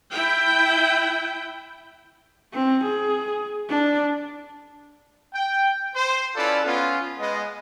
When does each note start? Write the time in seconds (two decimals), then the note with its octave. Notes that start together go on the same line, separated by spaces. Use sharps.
0.12 E4 G5
2.53 C4
2.84 G#4
3.69 D4
5.34 G5
5.95 C5
6.36 C#4 E4 F4 A4 B4 D5
6.65 B3 C#4 F4
7.19 G#3 B3 D#5